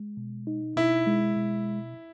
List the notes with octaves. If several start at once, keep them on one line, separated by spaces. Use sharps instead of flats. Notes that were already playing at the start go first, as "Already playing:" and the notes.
Already playing: G#3
B2
D#4
B2 E4
G#3
B2